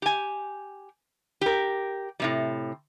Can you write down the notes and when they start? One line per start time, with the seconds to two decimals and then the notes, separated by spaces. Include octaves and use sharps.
0.02 G4 G#5
1.41 G4 A#4
2.20 A2 C3 G3